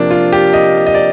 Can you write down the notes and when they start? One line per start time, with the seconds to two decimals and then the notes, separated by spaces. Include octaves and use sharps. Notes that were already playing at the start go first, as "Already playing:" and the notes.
Already playing: C3 F3 A#3 D4
0.11 F4
0.33 G4
0.53 D#5
0.87 D#5
0.95 D5